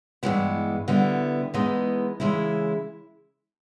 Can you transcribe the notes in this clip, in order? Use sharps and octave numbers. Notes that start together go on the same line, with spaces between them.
G2 E3 G#3 B3
D3 G3 B3 E4
E3 G#3 B3 D#4
C#3 E3 G#3 C#4 E4